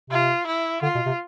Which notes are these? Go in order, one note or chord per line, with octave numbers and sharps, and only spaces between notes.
C3 F4
E4
D3 F4
B2
C3